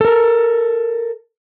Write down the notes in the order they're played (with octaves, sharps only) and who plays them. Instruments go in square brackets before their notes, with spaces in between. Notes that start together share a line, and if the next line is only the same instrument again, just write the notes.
[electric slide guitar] A4 A#4